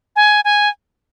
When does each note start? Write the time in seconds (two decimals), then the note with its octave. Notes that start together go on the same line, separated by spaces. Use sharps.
0.16 G#5
0.45 G#5